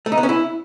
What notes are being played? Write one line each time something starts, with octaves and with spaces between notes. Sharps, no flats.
A3
D#4
B3
C#4
E4